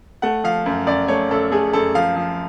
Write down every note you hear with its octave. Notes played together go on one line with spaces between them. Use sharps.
A3 F#5
F3 F5
F#2
F#2 D5
A3 C#5
F#2 A4
A3 G#4
F#2 A4
F3 F5
F3